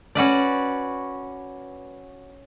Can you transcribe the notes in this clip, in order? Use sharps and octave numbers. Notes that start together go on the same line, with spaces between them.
C#4 F#4 B4 D5